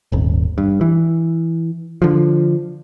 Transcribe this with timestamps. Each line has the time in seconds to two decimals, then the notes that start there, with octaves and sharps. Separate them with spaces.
0.12 D#1 G#1
0.58 G2
0.81 E3
2.02 D3 F3